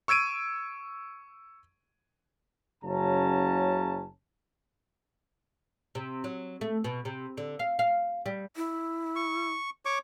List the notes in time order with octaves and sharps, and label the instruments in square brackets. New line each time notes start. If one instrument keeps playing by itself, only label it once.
[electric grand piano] C#6 E6 G#6 D7 D#7
[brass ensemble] F#1 C#3 F#3 C#4 A5 A#5
[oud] C3
F#3
A3
B2
C3
D3
F5
F5
G3
[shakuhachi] E4
[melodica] C#6
C#5 C#6 D6